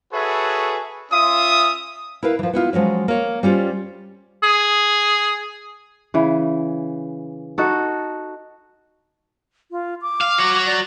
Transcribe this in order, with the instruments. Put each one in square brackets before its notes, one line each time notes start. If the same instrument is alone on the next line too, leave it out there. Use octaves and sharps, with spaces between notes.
[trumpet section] F#4 G#4 A4 B4 C#5 E5
C#4 F4 E5 D#6
[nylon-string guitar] E4 A#4 B4 F5
E3 F3
B3 E4 F4
F3 F#3 G#3 C#4
A#3 C#5
G3 C#4 F4 G4 C5
[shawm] G#4
[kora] C#3 E3
D#4 F#4 A4
[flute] F4
D6
[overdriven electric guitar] F5
F#4 C#5
[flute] D5